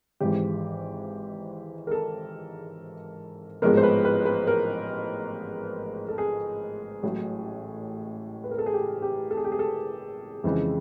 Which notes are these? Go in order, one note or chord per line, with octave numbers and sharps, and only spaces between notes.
G#1 G#2 E3 G4
A#4
A4
A1 G#2 F3 G#3 B3 A#4
C5
B4
B4
B4
A#4
A4
G#4
A1 A2 F#3
B4
A#4
A4
G#4
G4
G4
A4
G#4
G4
G#4
A4
F2 C#3 E3 G#3